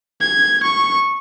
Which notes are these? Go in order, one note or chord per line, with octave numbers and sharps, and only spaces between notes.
G#6
C#6